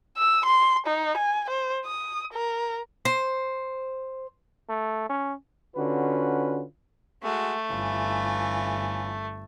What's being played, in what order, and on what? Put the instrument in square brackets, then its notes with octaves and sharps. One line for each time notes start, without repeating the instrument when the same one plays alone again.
[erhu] E6
C6
D#4
G#5
C5
D#6
A#4
[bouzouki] C5
[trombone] A3
C#4
[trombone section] D3 C#4 F4 F#4 B4
[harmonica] G#3 F#4 [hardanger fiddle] A3
[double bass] G1 [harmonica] E3 C#4 F4